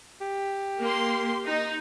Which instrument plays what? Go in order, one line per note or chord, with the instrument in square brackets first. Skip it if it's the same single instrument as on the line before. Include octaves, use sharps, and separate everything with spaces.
[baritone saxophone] G4
[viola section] A#3 C6
D#4